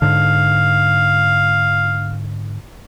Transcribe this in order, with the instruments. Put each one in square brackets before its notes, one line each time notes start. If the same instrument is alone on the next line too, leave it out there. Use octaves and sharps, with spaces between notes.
[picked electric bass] G#2 D3 [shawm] F5